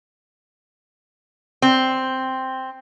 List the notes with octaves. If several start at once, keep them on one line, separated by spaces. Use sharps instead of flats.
C4